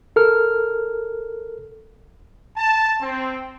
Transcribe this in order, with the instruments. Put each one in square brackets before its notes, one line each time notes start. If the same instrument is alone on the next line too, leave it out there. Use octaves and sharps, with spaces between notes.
[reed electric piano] A4 A#4 F6
[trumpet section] A5
C4